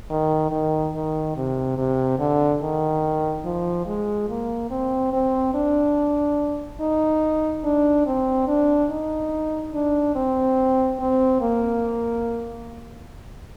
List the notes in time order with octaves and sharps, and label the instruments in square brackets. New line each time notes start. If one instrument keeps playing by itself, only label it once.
[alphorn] D#3
D#3
D#3
C3
C3
D3
D#3
F3
G#3
A#3
C4
C4
D4
D#4
D4
C4
D4
D#4
D4
C4
C4
A#3